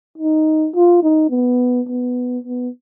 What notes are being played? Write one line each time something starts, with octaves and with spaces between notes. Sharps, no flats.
D#4
F4
D#4
B3
B3
B3